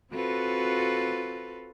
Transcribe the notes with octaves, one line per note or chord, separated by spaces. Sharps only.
C4 F4 F#4 A4 B4